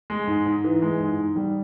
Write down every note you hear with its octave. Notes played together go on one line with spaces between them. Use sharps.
G#3
G#2
G#2
E3
G#3
G#2
G#2
G3